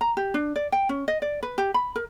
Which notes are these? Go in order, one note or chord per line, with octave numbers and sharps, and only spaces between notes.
A#5
G4
D4
D5
G5
C#4
D#5
D5
B4
G4
B5
A#4